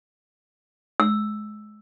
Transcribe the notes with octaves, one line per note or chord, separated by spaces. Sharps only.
E6